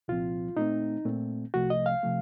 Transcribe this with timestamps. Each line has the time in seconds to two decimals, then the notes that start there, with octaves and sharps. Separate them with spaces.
0.08 C2 A#2 F3 C4 F4
0.57 A#2 A3 C4 D#4
1.05 A#2 A3 C4
1.54 C2 C3 F3 A3 F#4
1.70 D#5
1.86 F5
2.03 C3 F3 A3